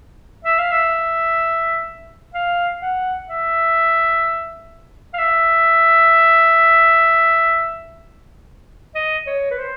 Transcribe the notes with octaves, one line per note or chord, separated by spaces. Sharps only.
E5
F5
E5
F5
F#5
E5
F5
E5
D#5
C#5
B4
C5